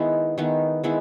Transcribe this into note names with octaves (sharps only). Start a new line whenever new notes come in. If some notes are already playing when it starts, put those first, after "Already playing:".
Already playing: D#3 G#3 B3 E4
D#3 G#3 B3 E4
D#3 G#3 B3 E4